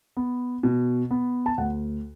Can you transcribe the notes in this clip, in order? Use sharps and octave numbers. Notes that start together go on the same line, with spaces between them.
B3
B2
B3
A5
D2 F#5